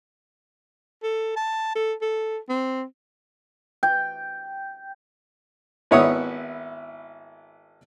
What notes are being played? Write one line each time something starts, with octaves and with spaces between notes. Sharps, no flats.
A4
A5
A4
A4
C4
G5
G#1 B3 E4 C#5 F#5 D#6